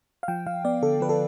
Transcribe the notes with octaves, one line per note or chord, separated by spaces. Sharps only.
F5
F3 G5
F3 F5
B3 D5
D3 A4
F3 B4
A4